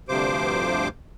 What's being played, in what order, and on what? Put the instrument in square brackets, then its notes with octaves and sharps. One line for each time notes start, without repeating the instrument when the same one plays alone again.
[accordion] D2 G2 C3 F3 C5 D6